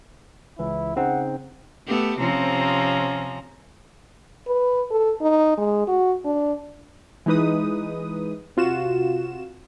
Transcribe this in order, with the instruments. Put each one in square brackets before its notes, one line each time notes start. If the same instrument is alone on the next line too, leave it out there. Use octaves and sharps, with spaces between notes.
[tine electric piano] C#2 E3 [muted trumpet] E4
[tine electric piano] C#3 C4 D#4 [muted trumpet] F#5
[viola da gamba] A3 B3 G4
[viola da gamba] C3 F3 C4 [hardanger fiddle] C#4 A#5
[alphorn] B4
A4
D#4
G#3
F#4
D4
[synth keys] E3 G#3 D#4 B4 D#6
C3 F4 F#4 E7